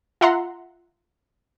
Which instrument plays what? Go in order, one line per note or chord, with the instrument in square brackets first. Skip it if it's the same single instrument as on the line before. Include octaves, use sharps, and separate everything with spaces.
[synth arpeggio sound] F4 E5 F#5 A#5 C6